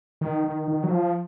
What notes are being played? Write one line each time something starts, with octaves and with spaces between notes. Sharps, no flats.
D#3
D#3
D#3
F#3
F3